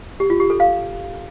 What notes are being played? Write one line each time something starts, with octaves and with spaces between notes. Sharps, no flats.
G4
F4
G4
A4
F5